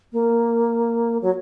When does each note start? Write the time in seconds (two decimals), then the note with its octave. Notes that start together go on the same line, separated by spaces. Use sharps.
0.12 A#3
1.21 F#3